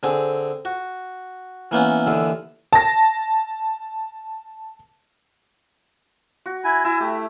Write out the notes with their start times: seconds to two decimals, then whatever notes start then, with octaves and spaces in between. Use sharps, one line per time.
0.03 D3 C4 G#4
0.65 F#4
1.71 E3 A#3 B3 C#4
2.07 D#2 D3 E3
2.73 A5 A#6
6.46 F#4
6.64 E4 G#5
6.85 E4 G#5 E6
7.00 A3 G4